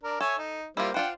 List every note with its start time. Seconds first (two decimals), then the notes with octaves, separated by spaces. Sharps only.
0.04 D4 A#4
0.20 A4 C#5 E5 G#5
0.38 D#4
0.77 G3 A#3 E4 F4 C5
0.94 D4 F4 C5 F#5 G5